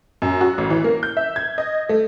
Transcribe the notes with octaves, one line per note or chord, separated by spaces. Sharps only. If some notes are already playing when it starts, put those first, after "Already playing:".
F#2
F#4
A1
E3
A#3
G6
E5
G#6
D#5
A3